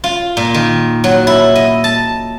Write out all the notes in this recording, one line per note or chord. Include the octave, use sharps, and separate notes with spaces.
F4
A#2
D#3
F#3
E4
D#5
A5